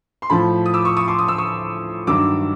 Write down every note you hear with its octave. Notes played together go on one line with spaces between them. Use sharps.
C6
A2 F3 A5 B5
D#6
D6 E6
C#6 D#6
C#6 D#6
C6 D6
D#6
E6
C#6 D#6
G2 D#3 F#3 D6 E6